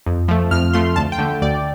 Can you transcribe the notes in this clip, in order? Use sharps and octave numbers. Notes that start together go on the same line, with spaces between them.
F2
F3 A3
F2 F6
F3 A3 C6
D2 A5
G5
D3 A3
D2 D5